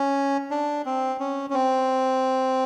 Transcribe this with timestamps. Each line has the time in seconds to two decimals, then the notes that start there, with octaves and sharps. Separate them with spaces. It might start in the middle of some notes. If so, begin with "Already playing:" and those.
Already playing: C#4
0.51 D4
0.86 C4
1.20 C#4
1.50 C#4
1.54 C4